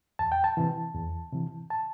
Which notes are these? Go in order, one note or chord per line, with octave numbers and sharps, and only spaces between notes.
E2 A5
G5
A5
C3 E3
E2
C3 E3
A5